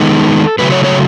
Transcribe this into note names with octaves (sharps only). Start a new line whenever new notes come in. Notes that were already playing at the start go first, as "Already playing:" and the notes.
Already playing: D#3 G#3 B3 D#4 A4
C#3 F#3 A3 B4
C#5
C#5